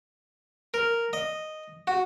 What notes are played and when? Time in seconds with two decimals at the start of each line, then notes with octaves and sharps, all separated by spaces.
0.74 A#4
1.13 D#5
1.87 F#4